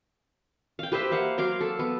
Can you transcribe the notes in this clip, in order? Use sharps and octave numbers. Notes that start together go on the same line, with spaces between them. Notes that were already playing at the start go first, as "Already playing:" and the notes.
F5 G5
G4 B4 C5 E5
A#3 F5 F#5
F#3 F5 C6 D6
A4
B3